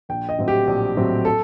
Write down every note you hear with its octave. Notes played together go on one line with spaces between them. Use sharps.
A#1 G5
D#5
A2 F#3 C4
G4
A#1
A2 F#3 C4
A4